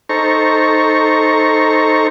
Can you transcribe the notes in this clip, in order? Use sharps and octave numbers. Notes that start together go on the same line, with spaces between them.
D#4 A4 C5 A#5 C#6